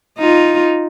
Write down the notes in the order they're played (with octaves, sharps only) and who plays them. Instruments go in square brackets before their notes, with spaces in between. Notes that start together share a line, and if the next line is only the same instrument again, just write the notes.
[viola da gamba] D#4 F4